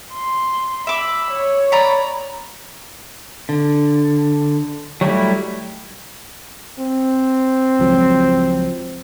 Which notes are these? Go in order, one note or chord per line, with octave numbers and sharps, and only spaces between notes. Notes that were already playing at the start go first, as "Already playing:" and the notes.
C6
E5 B5 D6
C#5
D5 A#5 B5
D3
F#3 G3 A3 E4
C4
C#2 F3 F#3